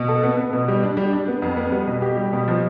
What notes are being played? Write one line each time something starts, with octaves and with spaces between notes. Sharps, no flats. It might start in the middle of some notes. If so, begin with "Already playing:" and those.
Already playing: B2
A4
B3
B3
B2
G3
D4
G3
D4
B3
F2
B3
G3
B2
G4
G3
B2
F3